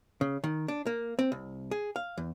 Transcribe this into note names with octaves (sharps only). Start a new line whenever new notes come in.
C#3
D#3
D4
A#3
C4
C2
G#4
F5
E2